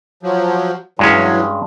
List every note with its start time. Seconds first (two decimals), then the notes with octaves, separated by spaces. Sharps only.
0.23 F3 F#3
0.99 G2 E3 F#3 G#3 C#4